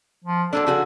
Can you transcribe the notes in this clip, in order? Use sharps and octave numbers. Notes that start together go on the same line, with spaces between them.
F3
F#3 A#3 D4 A4
C#3 F#4 G#4